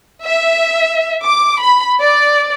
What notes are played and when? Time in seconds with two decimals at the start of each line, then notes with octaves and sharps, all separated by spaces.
0.23 E5
1.22 D6
1.61 B5
2.00 D5